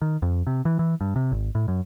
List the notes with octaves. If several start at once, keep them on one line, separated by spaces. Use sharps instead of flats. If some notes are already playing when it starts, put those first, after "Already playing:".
D#3
F2
C3
E3
E3
G2
C3
G#1
A2
F#2